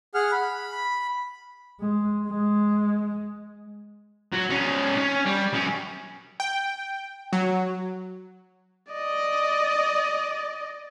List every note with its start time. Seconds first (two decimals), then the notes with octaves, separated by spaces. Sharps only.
0.15 G#4 F#5 F6
0.32 B5
1.80 G#3
2.27 G#3
4.33 F#3
4.50 C#4 D#4
4.97 C#4
5.25 G3
5.53 F#3 C#4
6.40 G5
7.33 F#3
8.92 D5 D#5